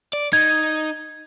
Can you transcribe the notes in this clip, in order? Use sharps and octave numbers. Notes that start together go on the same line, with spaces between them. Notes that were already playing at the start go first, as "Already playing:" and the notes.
D5
D#4 G#6